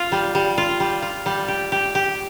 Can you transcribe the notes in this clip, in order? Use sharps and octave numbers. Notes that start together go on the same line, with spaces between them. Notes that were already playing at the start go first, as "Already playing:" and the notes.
Already playing: F4
G3
G3
F4
G3
F4
G3
G4
G4
G4